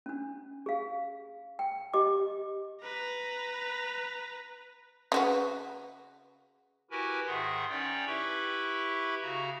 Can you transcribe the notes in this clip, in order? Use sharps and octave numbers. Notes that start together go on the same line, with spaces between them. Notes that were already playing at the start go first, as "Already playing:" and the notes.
C#4 D4
G#4 F5
G5
G4 D#5 D6
B4 A#5
C#3 F#4 B4
E4 F#4 G4 A#4 B4 G#5
G#2 D#3 G#4 E5 F#5 C6
C#4 D#4 C#5 D5 G5
E4 G4 B4 E5 B5 C#6
C#3 F#4 A#5